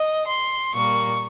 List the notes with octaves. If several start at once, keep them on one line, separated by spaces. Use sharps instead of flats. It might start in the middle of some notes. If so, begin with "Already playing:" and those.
Already playing: D#5
C6
A#2 G3 A#3 C#6